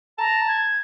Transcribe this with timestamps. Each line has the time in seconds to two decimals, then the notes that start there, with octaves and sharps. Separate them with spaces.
0.18 A5 A#5
0.48 G#6